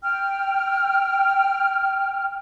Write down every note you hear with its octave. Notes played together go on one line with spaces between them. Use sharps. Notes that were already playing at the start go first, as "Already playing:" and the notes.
G5 F6